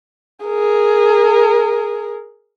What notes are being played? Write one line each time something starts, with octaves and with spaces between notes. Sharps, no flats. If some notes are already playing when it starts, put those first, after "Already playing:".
G#4 A#4